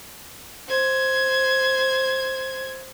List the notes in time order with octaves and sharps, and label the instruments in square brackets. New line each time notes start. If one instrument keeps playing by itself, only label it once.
[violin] C5 G#6